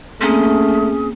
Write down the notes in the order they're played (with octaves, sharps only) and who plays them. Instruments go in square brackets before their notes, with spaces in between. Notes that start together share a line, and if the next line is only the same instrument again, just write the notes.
[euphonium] A3 [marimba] A#3 C4 [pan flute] C#4 [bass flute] G#4